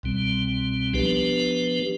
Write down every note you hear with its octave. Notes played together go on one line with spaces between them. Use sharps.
C2 B2 G3 C4
F3 B3 D4 G4 B4